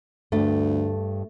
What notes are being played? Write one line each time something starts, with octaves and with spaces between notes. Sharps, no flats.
D2 G2 A3